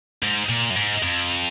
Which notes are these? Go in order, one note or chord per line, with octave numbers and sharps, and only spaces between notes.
G#2
A#2
F#2
G#2
F2